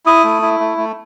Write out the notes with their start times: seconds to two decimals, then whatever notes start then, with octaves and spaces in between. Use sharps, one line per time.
0.06 E4 D#6
0.24 A3
0.42 E4
0.60 A3
0.78 A3